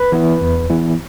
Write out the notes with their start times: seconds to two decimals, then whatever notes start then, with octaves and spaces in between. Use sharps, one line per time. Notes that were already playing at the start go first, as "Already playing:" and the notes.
Already playing: B4
0.12 E3 B3 E4
0.41 E2
0.70 E3 B3 E4